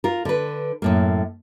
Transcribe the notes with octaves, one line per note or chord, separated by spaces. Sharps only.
F4 A#4
D3 B4
F#2 A2 A#3